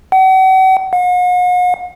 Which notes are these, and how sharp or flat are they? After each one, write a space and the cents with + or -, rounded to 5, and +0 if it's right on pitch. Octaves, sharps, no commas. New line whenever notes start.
F#5 +40
F#5 -45